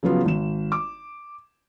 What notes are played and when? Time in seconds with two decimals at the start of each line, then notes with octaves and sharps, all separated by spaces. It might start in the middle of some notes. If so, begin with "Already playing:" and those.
0.03 C#3 F3 F#3 B3 F4
0.25 G#1 E7
0.72 D6